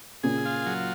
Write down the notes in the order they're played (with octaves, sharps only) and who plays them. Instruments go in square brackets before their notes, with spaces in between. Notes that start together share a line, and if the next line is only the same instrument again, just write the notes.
[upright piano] A#2 C#3 [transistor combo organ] G#4
[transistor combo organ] F4
F#3